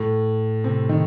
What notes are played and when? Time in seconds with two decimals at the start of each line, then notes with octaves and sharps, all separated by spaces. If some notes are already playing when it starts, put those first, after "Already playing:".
Already playing: A2
0.64 C3
0.89 D#3